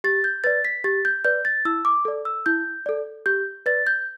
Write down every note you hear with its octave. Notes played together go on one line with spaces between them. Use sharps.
G4 A6
G6
B4 D5 A6
B6
G4 A6
G6
B4 D5 G6
A6
E4 E6
D6
A4 D5
E6
E4 G6
A4 D5
G4 G6
B4 D5 A6
G6